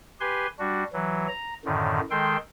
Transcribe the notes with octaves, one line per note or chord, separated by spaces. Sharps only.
G4 B4 G#5 C6
G3 D4 F#4
E3 F#3
A#5
F#2 A2 D3 D#3
D#3 G#3 A4 G5 C6